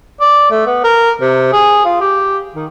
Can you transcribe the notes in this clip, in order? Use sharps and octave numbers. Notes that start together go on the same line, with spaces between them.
D5
A3
B3
A#4
C3
G#4
F4
G4
D#3